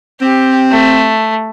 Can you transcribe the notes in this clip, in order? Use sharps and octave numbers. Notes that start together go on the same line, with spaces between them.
C4 G4
A3